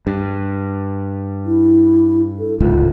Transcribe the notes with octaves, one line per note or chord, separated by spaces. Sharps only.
G2
E4
A4
D1 C#2 G#2 F4